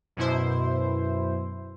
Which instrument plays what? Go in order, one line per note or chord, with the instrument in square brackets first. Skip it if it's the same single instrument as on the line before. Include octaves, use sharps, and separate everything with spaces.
[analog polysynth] F#2 B2 E4 C5